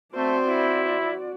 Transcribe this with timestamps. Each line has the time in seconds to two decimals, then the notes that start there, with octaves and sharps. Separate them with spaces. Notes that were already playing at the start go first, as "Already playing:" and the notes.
0.15 A3 C4 F#4 C5 D5
0.46 E4